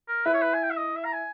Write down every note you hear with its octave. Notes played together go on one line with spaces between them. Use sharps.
A#4
E4 B4
C#5
B4
G#5
G5
E5
D#5
E5
A#5
G#5